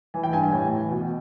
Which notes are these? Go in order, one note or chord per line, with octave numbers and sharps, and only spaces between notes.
E3 G#5
G5
G2 G#5
G#5
A2 G5
E3
B2